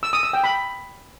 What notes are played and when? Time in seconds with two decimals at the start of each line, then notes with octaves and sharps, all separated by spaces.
0.03 E6
0.13 D#6
0.23 E6
0.33 G5
0.44 B5